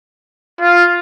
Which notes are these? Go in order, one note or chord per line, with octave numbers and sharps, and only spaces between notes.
F4